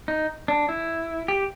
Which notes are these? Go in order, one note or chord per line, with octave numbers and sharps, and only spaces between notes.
D#4
D4
E4
G4